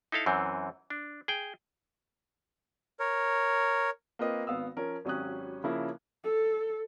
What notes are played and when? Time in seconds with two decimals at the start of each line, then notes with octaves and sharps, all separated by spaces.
0.12 D#4 E4 A4 F5
0.26 F#2 E3 C4
0.90 D4
1.28 G#4 G5
3.00 A#4 C#5
4.19 A#3 C4 F4 B4 D#5
4.47 G#1 B3 F5 D#6 E6
4.77 F3 C#4 A#4
5.05 G#1 F#3 C#4 G4 D#6 F#6
5.64 C#3 F3 A#3 C#4 E4
6.24 A4